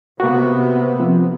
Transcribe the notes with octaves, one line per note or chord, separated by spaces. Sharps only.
C3 A#3 B3 F#4
F3 C4